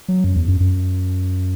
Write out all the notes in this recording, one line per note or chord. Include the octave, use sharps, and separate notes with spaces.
F#3
F#2
E2
F#2
F#2